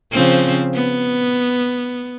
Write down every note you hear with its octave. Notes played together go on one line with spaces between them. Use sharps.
C#3 F3 C4
B3